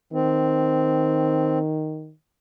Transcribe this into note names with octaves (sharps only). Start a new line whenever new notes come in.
D#3 C4